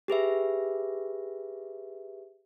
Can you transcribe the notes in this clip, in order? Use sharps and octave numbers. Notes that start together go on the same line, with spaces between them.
G4 G#4 B4 E5